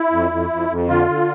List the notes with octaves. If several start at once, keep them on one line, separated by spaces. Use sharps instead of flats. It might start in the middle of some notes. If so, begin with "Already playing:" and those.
Already playing: E4
F2
F2
F2
F2
D3 F4
D3